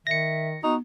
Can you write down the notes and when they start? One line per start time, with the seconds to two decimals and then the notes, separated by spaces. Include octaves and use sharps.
0.07 D#3 E5 A#6 C#7
0.63 B3 D#4 F#4